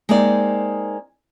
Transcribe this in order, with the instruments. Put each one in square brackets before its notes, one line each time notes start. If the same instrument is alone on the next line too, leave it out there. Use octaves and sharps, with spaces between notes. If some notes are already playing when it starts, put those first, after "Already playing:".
[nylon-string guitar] G#3 A#3 C4 D#4 D5